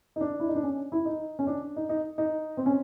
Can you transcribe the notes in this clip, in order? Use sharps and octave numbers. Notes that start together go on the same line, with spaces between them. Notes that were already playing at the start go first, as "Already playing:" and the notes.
D#4
D4
E4
D#4
D4
C#4
E4
D#4
C#4
D4
D#4
D#4
D#4
C4
C#4